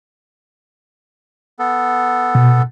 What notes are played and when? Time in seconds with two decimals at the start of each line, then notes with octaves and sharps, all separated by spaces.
1.59 B3 A4
2.35 B2